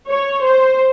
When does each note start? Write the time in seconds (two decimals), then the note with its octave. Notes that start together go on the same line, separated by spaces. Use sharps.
0.08 C#5
0.42 C5